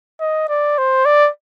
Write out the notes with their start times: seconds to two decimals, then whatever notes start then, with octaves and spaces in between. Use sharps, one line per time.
0.20 D#5
0.49 D5
0.78 C5
1.05 D5